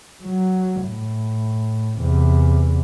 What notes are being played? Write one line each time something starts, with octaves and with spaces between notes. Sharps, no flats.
F#3
A2
E2 C3